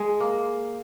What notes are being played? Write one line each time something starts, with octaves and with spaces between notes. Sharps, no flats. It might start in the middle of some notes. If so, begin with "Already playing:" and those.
Already playing: G#3
A#3